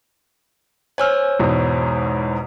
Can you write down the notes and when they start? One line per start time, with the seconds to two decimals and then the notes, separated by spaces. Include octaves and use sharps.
0.98 C5 C#5 G#5 E6 F6
1.39 E2 G#2 B2